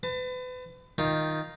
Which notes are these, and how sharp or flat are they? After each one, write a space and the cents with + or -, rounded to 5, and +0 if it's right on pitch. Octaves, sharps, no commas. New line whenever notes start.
B4 +35 A5 +30
D#3 +0 F4 +0 G5 +0